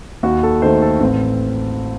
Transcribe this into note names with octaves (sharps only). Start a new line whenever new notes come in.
D#2 F#4
A4
D#3 A3 C5
A4
A1 C4